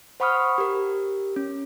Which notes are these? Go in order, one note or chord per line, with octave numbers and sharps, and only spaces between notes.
C5 F#5 B5 C#6 D#6 F6
G4 A#4
C#4